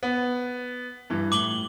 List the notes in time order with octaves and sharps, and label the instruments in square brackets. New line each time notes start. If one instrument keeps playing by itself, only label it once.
[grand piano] B3
G2 E3
[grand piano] A2 [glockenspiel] D6 F#7 G7